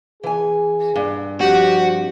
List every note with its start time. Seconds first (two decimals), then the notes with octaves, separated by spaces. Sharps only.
0.23 E3 G#4 G#5
0.96 G2
1.41 F3 G3 C4 F#4 G4